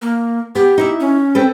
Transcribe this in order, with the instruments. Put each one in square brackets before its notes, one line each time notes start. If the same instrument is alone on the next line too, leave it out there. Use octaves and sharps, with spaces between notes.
[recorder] A#3
[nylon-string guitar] B3 [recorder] G4
[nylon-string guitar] D#4 E4 E5
[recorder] C#4
[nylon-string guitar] C4 A4 B4